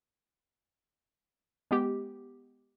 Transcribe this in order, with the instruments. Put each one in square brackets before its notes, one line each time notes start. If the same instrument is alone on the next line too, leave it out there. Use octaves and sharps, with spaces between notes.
[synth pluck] G#3 B3 G4